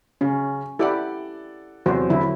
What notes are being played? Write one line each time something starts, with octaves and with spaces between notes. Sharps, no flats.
C#3 C#4
E4 G4 A4 D5 F#5
E2 C3 F#3 F#4 C5
D3 F#3 E4